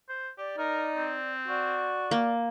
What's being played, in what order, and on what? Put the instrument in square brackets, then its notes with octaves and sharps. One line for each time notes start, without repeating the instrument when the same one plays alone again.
[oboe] C5
[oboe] G4 [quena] D5
[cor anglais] D#4 [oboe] A#4
[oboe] C4
[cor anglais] F#4 [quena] D5
[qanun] A#3